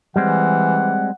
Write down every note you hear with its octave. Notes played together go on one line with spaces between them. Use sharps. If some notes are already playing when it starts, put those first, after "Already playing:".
E3 G3 G#3 C4 F#5